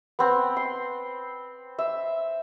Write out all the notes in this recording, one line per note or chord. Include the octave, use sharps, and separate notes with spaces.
B3 C4
C6
E5